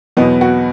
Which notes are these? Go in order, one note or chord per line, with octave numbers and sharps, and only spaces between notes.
E2 B2 F#3 B3 D#4
F#4